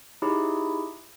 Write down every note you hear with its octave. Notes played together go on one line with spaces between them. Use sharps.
D#4 E4 G4 G#4 C#5